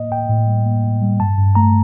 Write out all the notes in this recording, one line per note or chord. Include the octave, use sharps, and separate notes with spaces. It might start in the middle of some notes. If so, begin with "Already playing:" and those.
Already playing: A2 A#3 D#5
A2 G5
A2
G3
A#3
A2
G3
G2 A5
G2
A3 A#5